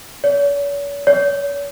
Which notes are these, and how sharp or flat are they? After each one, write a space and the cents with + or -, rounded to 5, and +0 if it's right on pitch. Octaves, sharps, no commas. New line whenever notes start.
C#5 +45
C#5 +35